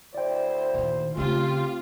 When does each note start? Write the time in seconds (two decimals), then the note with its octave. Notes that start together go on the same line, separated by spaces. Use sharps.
0.15 D2 E4 C5 D5 G5
0.74 A#2 D#3
1.17 C#3 A3 C4 F4 G4